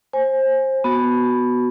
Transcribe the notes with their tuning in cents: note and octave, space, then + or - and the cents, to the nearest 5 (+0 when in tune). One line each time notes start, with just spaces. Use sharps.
C5 +25 G#5 +0
B3 +0 F#4 +0